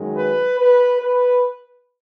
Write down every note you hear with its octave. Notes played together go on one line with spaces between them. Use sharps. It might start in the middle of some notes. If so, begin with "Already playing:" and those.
Already playing: F#2 D#3 G#3
B4
B4
B4